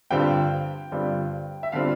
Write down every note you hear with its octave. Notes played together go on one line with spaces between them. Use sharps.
G2 D3 G3 C4 F4 G5
G2 D3 G3 C4 F4
E5
D3 G3 C4 F4 F5